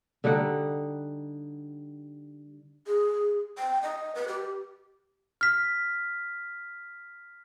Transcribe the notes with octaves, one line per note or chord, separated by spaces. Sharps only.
D3 G3 D#4 F#5
G#4
G5
D#5
B4
G4
F6 B6